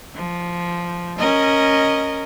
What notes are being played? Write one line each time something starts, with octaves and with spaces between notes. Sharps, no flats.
F3
C#4 A#4 D#5